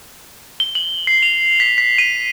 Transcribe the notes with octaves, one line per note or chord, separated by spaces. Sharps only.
G7
F#7
C7
F7
B6
B6
D#7